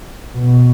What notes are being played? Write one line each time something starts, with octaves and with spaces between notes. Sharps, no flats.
B2